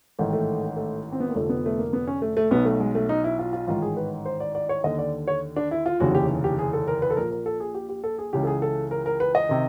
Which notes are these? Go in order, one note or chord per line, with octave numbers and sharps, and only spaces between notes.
A1 G#2 D#3 A3
A3
A3
C4
B3
A#3
F1 F2 D3 A3
B3
A3
A#3
B3
C#4
A3
A3
B1 B2 B3
A3
G#3
A3
D#4
E4
F4
F4
A1 G#2 D#3 F4
G#4
B4
C5
D5
D5
C#5
D#2 D3 D#5
D5
C#5
D4
E4
F4
F1 D#2 C#3 E3 F#4
G4
G4
G#4
A4
A#4
B4
A4
A#1 A#2 A#4
A#4
A4
G#4
G4
G4
A4
G#4
C#2 C#3 E3 G4
A4
G#4
A4
A#4
A#4
B4
D#5
C3 D#3